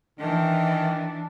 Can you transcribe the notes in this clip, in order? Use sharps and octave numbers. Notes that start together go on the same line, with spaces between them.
D#3 E3 D4